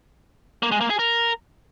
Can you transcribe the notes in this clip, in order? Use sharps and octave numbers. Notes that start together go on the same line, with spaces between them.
A#3
G#3
A#3
G#4
A#4